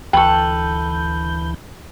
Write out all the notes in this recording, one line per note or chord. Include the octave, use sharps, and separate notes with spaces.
D2 E3 A4 B4 G5 C#6 G6